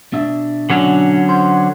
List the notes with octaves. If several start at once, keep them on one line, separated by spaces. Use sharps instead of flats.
B2 D4 E5
D3 F#3 C#4
C5